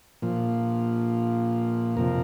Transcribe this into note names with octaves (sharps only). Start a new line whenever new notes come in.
A#2 F3
F2 C3 F3 A#4